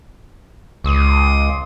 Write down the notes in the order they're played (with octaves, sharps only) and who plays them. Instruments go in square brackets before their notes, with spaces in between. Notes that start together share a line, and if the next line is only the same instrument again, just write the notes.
[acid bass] C#2 [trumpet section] C6 D6 D#6